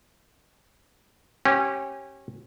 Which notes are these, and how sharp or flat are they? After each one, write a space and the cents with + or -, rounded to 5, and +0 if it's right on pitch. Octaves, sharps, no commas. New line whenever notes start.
C#4 -25 G4 -15